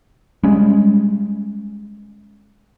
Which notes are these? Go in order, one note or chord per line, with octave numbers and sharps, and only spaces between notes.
G3 G#3 C#4